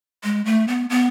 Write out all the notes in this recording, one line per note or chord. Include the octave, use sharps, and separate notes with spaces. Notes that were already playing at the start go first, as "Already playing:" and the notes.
G#3
A3
B3
B3